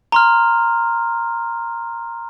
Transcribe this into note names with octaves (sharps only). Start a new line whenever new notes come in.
A#5 C6 F6